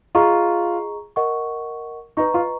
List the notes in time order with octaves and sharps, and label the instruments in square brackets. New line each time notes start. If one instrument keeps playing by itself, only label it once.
[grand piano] F4 [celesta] G#4 D#5 A#5 C#6
[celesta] A#4 D#5 F#5 C#6
[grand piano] D#4 [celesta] B4 D#5 A#5 C#6
[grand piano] F4